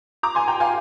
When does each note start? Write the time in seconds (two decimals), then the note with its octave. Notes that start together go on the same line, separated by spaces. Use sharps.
0.23 A#5 D6
0.35 G#5 C6
0.48 G5 A#5
0.60 F5 G#5